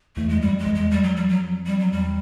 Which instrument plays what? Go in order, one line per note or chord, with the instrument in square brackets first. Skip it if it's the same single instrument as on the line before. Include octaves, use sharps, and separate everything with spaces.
[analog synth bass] E2 [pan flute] A3
[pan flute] G#3
[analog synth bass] F#2
[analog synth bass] F2 [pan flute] G3
[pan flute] G#3
[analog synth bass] E2
[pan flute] G#3
[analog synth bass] F2 [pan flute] G3
[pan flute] F#3
G3
F#3
G3
F#3
[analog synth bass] E2 [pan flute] G3